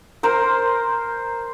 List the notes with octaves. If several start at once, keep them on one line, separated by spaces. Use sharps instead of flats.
A#4 C5